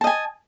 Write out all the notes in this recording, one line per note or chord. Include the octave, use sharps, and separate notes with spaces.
D#5 G#5 A5